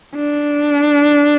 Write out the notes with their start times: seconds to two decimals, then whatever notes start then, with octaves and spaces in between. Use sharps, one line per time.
0.16 D4